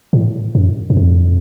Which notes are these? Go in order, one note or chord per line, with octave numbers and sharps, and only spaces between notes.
A2
F#2
F#2
F2